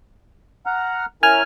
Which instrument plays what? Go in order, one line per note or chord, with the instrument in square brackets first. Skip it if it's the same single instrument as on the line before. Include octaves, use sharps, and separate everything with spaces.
[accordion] F#5 A#5 F6
[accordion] C#4 E4 A#4 [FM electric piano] G#5 F6